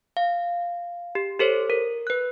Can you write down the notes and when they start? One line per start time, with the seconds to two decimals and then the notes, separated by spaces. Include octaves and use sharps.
0.17 F5
1.15 G4
1.39 G4 A4 C5 C#5
1.70 A#4
2.07 B4 F#6